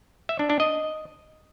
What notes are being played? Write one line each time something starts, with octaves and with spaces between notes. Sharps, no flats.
E5
D4
D4
D#5